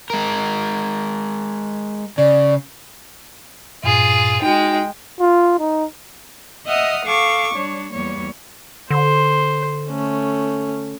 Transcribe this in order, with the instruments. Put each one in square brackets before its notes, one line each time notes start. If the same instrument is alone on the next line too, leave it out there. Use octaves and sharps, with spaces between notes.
[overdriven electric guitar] G#3 A#4
[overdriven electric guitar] C#3 [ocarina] D5
[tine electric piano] G2 A#2 [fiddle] F4 G#4
[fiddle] G#3 G5 [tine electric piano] D#4 F#4
[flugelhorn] F4
D#4
[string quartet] D#5 E5 F#5 D#6 F6
A4 F5 C#6 D6
G3 D4 C#5
E2 G3 A#3 C#5
[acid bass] D3 [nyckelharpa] C5
[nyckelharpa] A3 C#4